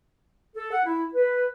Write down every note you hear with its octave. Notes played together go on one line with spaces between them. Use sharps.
A4
F#5
E4
B4